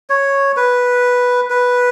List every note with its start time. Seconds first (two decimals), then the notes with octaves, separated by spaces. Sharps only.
0.10 C#5
0.57 B4
1.50 B4